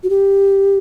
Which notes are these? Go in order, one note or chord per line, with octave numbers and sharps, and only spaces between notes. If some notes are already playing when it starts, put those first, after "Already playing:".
F#4
G4